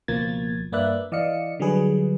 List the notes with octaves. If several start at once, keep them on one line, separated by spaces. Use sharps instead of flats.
C#2 B2 F3 A#3 G#6 A6
G2 A#3 B4 D5 E5 F#6
E3 D5 D#5 F5 C#7
D3 F#3 G3 G#4 B4